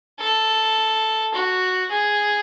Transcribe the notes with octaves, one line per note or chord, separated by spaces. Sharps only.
A4
F#4
G#4